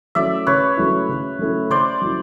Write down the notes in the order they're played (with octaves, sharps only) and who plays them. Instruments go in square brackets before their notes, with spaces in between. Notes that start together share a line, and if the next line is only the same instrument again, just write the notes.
[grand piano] F#3 A3 C#4 E4 [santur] D5 E5
[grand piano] C#3 [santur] B4 C#5
[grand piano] F#3 A3 C#4 E4
C#3
F#3 A3 C#4 E4
[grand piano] C#3 [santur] C5 D5
[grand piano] F#3 A3 C#4 E4